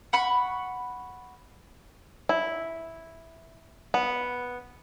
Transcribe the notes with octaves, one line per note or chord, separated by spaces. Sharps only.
F#5 B5 C#6
E4
B3